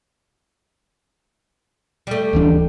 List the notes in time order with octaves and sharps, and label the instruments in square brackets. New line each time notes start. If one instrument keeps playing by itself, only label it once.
[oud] G3 A3
[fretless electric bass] D1 E3 D4